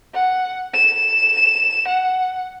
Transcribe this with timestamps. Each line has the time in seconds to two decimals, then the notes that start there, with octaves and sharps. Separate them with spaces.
0.14 F#5
0.74 E7
1.88 F#5